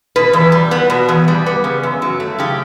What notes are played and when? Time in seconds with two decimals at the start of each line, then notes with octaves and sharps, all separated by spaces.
0.16 B2 B4
0.33 E2
0.52 G3
0.71 B3
0.90 B2
1.09 E2
1.28 G3
1.46 B3
1.64 C#3
1.83 F#2
2.02 F#3
2.20 A3
2.39 C#3 G4